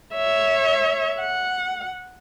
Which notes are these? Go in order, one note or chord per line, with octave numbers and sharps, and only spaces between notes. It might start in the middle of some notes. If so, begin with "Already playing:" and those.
C#5 E5
F#5